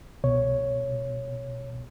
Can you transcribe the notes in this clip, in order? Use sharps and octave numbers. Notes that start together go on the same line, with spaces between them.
C2 B2 C#5